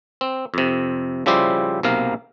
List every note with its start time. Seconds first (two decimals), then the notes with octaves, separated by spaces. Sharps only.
0.21 C4
0.54 F2 C3
1.26 C#3 F3 G3 E4 G4 C5
1.83 B1 C3 A#3 F5